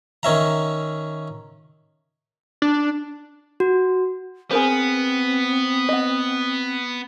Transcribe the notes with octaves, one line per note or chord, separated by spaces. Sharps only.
D#3 C#4 E5 A#5
D4
F#4
B3 C4 G#4 A#4 C5
D#5 F#5